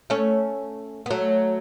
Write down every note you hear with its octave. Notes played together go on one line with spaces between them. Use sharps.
A3 C#4
B3
F#3 A3